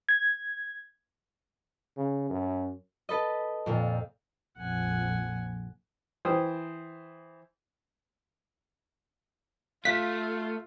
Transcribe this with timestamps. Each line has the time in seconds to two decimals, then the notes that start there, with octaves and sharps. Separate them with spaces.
0.09 G#6
1.97 C#3
2.29 F#2
3.09 A4 B4 D#5
3.66 F2 A#2 F3
4.57 A#1 F2 F#5 G#5
6.25 E3 C5 G5 D#6
9.85 A3 F4 F5 F#6 B6